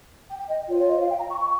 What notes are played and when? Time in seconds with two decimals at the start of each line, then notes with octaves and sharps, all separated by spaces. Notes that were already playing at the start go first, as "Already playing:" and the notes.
0.28 G5
0.38 G5
0.48 D#5
0.69 F4 C#5
0.73 C5
0.79 C#5
0.89 D#5
0.99 F5
1.09 G5
1.20 A#5
1.30 C#6
1.40 C#6